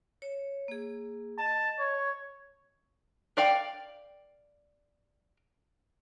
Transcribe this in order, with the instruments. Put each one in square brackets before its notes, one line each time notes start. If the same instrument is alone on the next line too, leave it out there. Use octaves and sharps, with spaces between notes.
[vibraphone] C#5
A#3 G#4
[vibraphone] D#5 [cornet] A5
[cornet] C#5
[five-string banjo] A#4 D5 F5 G5